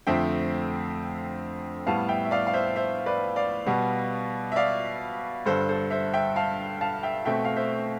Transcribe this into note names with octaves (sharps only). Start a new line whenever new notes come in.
F2 D3 A3 C4 E5 G5
A2 G3 B3 F5 A5
E5 G5
E5
D5 F5
F5
C5 E5
C5 E5
B4 D5
D5 F5
B2 G3 B3
E5
D5 F5
G2 D3 G3 A4 C5
A4 C5
C5 E5
E5 G5
F5 A5
F5 A5
E5 G5
B2 A3 C4 E5 G5
F5
C5 E5